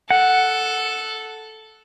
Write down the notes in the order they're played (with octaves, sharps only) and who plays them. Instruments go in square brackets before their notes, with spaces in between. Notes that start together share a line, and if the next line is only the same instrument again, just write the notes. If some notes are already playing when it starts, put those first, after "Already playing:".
[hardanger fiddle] A4 [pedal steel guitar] F#5